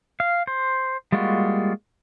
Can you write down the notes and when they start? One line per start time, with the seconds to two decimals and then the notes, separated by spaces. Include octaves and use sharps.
0.20 F5
0.47 C5
1.12 G3 G#3 A#3 F4 F#4